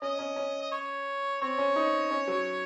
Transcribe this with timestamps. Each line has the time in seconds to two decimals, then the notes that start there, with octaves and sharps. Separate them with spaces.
0.01 C#4 D#5
0.19 C#4
0.36 C#4
0.61 D#5
0.72 C#5
1.41 C4 C#5
1.58 C#4
1.76 D#4
2.11 C#4
2.27 F#3